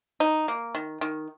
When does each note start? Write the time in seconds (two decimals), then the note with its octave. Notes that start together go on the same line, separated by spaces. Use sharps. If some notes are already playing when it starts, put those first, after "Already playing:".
0.20 D#4
0.48 A#3
0.75 D#3
1.01 D#3